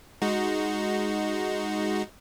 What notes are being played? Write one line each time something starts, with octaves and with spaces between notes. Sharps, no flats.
G#3 D#4 F#4